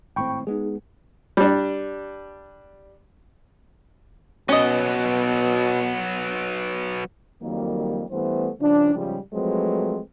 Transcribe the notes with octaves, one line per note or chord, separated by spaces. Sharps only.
G#1 A2 C4 G5 B5 C#6
G#3 B3 D#4 G#4
G3 D4
B2 F#3 B3 C#4 D#5
F2 D#3 F#3 G3 A#3
G2 E3 G3 A3 B3 C5
G2 C#3 F3 D4
G#2 C#3 F3 G3
F3 F#3 G#3 A3 C4 B4